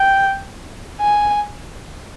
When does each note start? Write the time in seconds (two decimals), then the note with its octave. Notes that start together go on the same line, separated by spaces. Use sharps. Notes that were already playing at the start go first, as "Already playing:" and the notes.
Already playing: G5
1.01 G#5